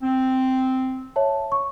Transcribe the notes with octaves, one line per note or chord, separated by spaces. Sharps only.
C4
C#5 E5 A5
C#6